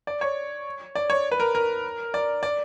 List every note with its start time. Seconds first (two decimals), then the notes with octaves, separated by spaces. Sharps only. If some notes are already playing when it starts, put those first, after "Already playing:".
0.07 D5
0.21 C#5
0.95 D5
1.10 C#5
1.31 B4
1.40 A#4
1.55 A#4
2.14 D5
2.43 D5